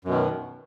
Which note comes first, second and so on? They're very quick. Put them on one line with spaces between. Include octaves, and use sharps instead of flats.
F#2 B2 D#3